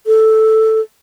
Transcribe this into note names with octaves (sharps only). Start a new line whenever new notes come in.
A4